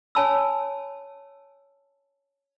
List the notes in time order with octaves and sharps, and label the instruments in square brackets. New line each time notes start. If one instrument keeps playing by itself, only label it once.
[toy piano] C#5 G#5 A5 B5 E6